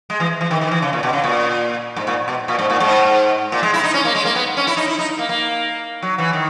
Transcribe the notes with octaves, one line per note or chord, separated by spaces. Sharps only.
G#3
E3
E3
D#3
D#3
E3
C#3
A#2
B2
C#3
A#2
G#2
A#2
B2
A#2
G#2
A#2
G#2
A#2
G#3
E4
D#4
C#4
A#3
G#3
A#3
B3
C#4
E4
D#4
E4
D#4
A#3
A#3
F#3
E3
D#3